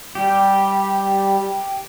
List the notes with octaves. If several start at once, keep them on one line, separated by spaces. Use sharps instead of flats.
G3 G4